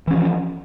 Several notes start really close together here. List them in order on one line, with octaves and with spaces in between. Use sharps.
E3 C#4 F3